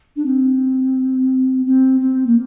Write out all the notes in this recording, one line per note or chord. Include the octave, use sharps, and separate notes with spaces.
D4
C4
C4
C4
A#3